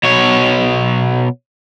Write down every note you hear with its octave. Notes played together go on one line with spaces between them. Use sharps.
B2 C#5